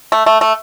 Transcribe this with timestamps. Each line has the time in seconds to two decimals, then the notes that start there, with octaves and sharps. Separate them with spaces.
0.12 A3
0.26 A3
0.41 A3